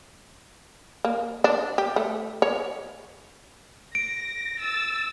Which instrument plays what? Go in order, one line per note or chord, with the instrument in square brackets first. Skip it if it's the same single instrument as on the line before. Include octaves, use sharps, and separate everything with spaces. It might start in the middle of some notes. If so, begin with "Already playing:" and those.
[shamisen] A#3
D4
G4
A3
C#5
[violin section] A#6 [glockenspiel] D7
[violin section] E6 A6